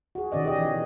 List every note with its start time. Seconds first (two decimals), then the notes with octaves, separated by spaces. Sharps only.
0.15 F#4 G#4
0.32 B2 D#3 C#4 D5 D#5
0.45 G4 G#4 D#5
0.58 E3